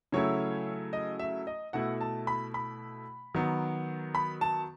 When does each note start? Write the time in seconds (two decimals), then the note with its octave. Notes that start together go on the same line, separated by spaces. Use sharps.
0.12 C#3 F#3 A3 E4 C#5
0.93 D#5
1.19 E5
1.47 D#5
1.73 B2 A3 E4 F#5
2.01 A5
2.27 B5
2.54 B5
3.34 D#3 F#3 B3
4.15 B5
4.41 A5